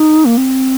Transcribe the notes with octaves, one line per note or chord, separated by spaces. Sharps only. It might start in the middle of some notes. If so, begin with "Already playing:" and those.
Already playing: D#4
A#3
C4